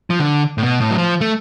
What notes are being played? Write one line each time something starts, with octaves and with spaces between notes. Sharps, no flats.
F3
D3
A2
B2
A2
F#3
F3
A3